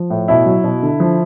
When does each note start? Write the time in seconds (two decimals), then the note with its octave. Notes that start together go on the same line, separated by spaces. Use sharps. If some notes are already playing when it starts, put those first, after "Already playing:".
Already playing: F3
0.10 A2
0.28 B2 E4
0.46 F#3
0.64 B2
0.83 D3
1.00 F3